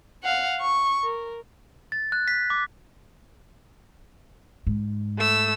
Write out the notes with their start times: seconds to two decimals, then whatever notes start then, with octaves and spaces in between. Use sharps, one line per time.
0.24 F5 F#5
0.61 C#6
1.03 A#4
1.92 A6
2.12 F#6
2.28 B6
2.50 D6
4.67 G#2
5.18 A3 E6